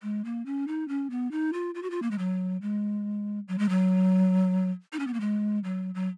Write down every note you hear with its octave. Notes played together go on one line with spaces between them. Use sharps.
G#3
A#3
C#4
D#4
C#4
B3
D#4
F4
F4
F#4
F4
A#3
G#3
F#3
G#3
F#3
G#3
F#3
D#4
C#4
B3
A#3
G#3
F#3
F#3